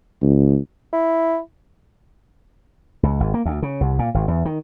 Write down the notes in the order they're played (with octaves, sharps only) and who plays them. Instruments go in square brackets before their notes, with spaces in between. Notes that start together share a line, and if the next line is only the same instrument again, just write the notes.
[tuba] C#2
[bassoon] E4
[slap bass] C#2
G#1
A#3
D2
C#3
C2
A#2
G#1
E2
D#3